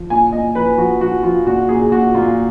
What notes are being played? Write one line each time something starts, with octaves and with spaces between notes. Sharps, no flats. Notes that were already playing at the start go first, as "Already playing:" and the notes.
Already playing: F3
A#2 G#5
A#2 D#5
F3 B4
F3 F#4
F3 F#4
F3 F4
A#2 F#4
A#2 G#4
A#2 F#4
A#2 F4